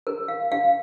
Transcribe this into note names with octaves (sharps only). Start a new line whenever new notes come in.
A#4
F5
F5